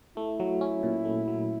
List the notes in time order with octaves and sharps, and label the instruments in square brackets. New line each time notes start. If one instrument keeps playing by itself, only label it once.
[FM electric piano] A3 [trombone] E4
[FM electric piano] F#3
C#4
A#2
A3
F#3